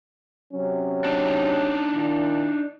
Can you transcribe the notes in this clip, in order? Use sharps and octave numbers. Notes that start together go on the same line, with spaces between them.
C3 F#3 C#4
D4 D#4
A#2 D#3 E4